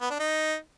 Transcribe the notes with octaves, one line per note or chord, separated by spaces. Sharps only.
B3
D4
D#4